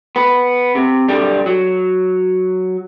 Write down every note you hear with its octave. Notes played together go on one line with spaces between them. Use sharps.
B3
C3
B1 D3 G3
F#3